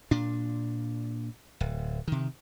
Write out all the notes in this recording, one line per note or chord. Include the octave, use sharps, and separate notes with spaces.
A#2 D4
D1
C3 D#3